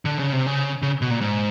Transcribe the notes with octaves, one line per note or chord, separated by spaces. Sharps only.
D3
C#3
C3
C#3
C#3
B2
A#2
G#2